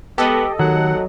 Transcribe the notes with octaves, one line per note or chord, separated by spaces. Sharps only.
G#3 B3 G4 A4 D#5
D#2 D#3 F#3 F#5